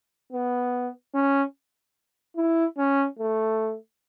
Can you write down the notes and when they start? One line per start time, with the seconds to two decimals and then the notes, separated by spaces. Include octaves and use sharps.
0.32 B3
1.14 C#4
2.36 E4
2.78 C#4
3.19 A3